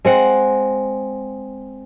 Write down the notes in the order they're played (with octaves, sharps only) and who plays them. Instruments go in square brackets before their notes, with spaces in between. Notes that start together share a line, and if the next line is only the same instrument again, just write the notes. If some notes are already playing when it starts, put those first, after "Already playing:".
[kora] G#3 C4 F#5